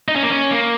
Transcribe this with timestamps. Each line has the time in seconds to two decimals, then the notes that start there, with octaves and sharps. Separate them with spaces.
0.08 D#4
0.16 C#4
0.23 A#3
0.30 C#4
0.52 A#3